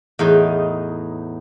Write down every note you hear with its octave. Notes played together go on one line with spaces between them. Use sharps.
E2 A2 D#4